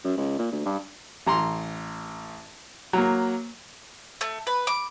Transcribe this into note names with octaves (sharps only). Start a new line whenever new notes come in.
F#2
C#2
A#2
D2
G2
A1 A#5 C6
F#3 A#3
A3
B4
D6